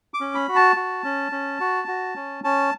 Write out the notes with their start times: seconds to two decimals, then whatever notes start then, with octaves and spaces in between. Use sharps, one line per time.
0.14 D6
0.21 C#4
0.35 B5
0.49 F#4
0.56 A5
0.76 F#4
1.04 C#4
1.32 C#4
1.60 F#4
1.88 F#4
2.16 C#4
2.44 C#4 A5